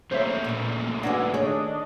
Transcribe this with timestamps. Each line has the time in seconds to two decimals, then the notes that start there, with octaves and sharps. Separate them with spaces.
0.11 C#3 A3 A#3 C5 C#5 E5
0.44 E2 A#2
1.03 G#2 E3 D4 F#4 G#5
1.34 D#3 A3 D4 G#4 C#5 D#5